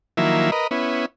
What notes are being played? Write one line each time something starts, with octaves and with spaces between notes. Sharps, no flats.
D#3 F3 F#3 A#3 E4 E5
A#4 B4 D#5
B3 C#4 E4